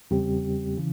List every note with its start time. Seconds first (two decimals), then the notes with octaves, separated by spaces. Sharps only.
0.11 E2 C#3 G3 C4 G4
0.77 C#3 E3